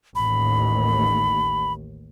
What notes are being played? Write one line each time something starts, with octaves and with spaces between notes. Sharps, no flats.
A1 D#2 B5